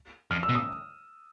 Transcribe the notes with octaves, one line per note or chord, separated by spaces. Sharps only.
F2 F6
E6
B2
D#6